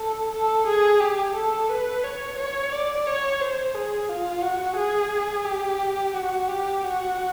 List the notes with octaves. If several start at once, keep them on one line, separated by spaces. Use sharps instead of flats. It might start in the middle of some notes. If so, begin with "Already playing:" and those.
Already playing: A4
A4
G#4
G4
A4
B4
C#5
C#5
D5
C#5
C5
G#4
F4
F#4
G#4
G4
F#4
G4
F#4